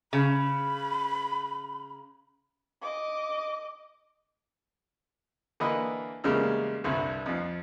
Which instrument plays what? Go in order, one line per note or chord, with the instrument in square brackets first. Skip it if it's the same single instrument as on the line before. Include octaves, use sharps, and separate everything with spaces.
[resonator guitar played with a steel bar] C#3 [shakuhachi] B5
[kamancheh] D#5 D6
[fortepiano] D3 E3 A#3 B4 D#5
E2 C#3 G3 G#3 A#3
C2 G2 D3
F2 F3